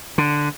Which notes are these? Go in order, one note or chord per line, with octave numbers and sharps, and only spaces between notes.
D3